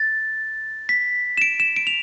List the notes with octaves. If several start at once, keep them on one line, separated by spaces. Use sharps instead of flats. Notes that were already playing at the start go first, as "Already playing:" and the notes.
Already playing: A6
B6
E7
D7
E7
D7
F7